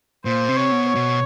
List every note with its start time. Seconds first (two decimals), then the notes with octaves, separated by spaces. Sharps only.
0.25 A#2 C5
0.49 C3
0.56 C#5
0.72 B2
0.88 C#5
0.95 B2